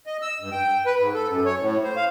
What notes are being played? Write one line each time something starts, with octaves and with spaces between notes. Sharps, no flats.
D#5
E6
G2
G5
B4
G#2
A4
F#2
C#5
A2
C5
F5